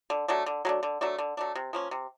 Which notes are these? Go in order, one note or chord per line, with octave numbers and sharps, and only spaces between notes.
D3
F#3 A3 D4
D3
F#3 A3 D4
D3
F#3 A3 D4
D3
F#3 A3 D4
C3
F3 A#3 C#4
C3